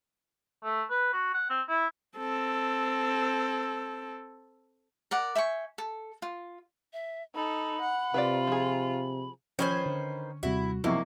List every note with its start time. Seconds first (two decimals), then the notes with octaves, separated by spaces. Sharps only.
0.64 A3
0.90 B4
1.13 F#4
1.34 F#5
1.50 C4
1.68 E4
2.17 C4 A4
5.11 A#4 D5 F#5
5.35 E5 G5 G#5 C#6
5.78 A4
6.22 F4
6.93 E5
7.35 D#4 A4 B5
7.81 F#5
8.14 C3 F4 B4 C#5 D5
8.47 F3 G#4
9.59 D#3 F3 C#4 B4 C5 G#6
9.86 D3
10.43 D#2 C3 G3 E4 F#4
10.84 B1 C3 F3 A#3 E4 C#6